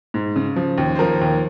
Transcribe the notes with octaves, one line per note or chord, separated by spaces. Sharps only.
G#2
C#3
F3
D#2
C5
F3 A#4
D#2